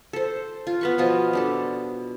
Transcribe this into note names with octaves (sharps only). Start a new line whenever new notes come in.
A4 C5
F4
B3 B4 C#6
B2 F3 F4 D#5
G3 D4 A4